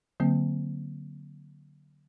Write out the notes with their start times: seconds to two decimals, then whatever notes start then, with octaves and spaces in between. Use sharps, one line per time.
0.20 D3 F#3 A#3 C4